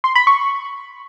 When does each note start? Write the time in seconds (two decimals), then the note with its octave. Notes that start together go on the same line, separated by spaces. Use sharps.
0.04 C6
0.15 B5
0.27 C#6